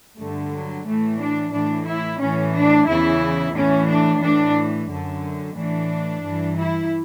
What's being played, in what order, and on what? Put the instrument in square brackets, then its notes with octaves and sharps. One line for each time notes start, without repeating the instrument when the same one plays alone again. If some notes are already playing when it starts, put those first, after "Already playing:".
[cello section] G2 D3 A3
F#3
A2 E3 A3
D4
A2 E3 D4
E4
A2 E3 C#4
D4
E2 C#3 E3 E4
A2 E3 C#4
D4
A2 E3 D4
F#2 D3
A2 E3 D4
G2 E3
E4